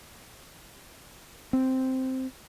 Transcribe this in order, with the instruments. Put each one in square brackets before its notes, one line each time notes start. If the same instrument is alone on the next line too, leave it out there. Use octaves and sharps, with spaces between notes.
[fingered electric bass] C4